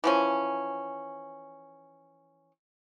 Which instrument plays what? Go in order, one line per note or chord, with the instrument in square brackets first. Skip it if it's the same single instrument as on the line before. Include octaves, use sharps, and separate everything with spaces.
[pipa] E3 F3 C#4